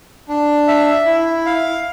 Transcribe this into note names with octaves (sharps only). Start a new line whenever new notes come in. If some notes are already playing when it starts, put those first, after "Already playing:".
D4
E5
E4
F5